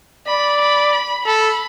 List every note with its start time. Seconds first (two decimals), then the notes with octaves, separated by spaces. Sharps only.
0.27 D5 B5
0.61 B5
0.93 B5
1.26 A4 B5